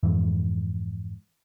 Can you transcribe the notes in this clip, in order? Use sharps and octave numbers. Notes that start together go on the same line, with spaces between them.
F2 G#2 E3